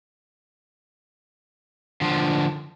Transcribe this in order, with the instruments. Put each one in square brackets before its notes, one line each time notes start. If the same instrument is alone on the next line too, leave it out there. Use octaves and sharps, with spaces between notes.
[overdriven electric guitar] D3 F3